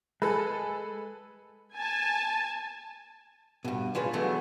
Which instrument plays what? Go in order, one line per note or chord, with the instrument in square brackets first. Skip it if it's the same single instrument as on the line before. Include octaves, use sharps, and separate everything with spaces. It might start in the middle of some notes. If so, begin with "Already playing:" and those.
[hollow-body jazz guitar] G#3 [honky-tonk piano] G#4 A4 B4
[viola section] G#5 A5
[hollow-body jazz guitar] G2 B2
C#3 G#3 D4 F4 B4 C#5
D3 E3 F#3 G#3 A3 B3